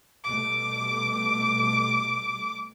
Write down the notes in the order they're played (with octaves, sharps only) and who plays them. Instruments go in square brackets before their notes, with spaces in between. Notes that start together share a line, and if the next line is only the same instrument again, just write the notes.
[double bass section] B2 G3 A3 [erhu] D6
[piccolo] D7